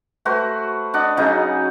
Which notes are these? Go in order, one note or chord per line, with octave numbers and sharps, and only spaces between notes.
A3 F#4 B4 C5
D4 D#5 F#5
C#3 F#3 D#4 G#4